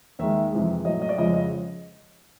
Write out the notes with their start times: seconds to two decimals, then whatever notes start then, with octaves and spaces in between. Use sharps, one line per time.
0.19 D#2 D#3 G#3 E5
0.53 F2 C3 E3 G#3
0.85 A2 F#3 D#5
1.02 D#5
1.09 D5
1.17 F2 C#3 F3 G#3 D#5
1.34 D#5